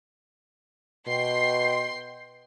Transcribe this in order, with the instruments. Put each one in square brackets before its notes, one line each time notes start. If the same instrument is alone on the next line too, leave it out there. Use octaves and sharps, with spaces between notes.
[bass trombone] B2 [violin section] G5 C6 C7